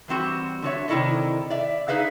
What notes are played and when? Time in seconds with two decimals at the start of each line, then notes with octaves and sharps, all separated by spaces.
0.08 E3 G3 C4 F#4
0.62 D3 F#4 C#5 E5
0.88 C3 D#3 E4 A4 D5 D#5
1.50 D5 E5
1.88 D#4 G#4 B4 E5 F5